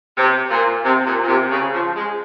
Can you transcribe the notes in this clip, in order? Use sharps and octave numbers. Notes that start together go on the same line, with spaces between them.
C3
A#2
C3
A#2
A#2
C3
C#3
F3
G#3